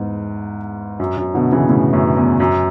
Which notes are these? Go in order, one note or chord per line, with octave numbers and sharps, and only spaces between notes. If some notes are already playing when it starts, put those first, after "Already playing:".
Already playing: E2 G#2
F#2
F#2
B2 D3
C#3 E3
A2 C#3
F#2 A2
E2
F#2